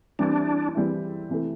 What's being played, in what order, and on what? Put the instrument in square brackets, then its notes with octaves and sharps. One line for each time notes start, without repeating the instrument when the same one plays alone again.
[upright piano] E3 G3 C4 E4 [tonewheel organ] D4
[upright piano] E3 G3 C4 E4
C3 E3 A3